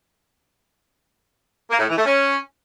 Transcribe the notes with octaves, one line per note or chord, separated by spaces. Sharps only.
A#3
A2
E3
A3
C#4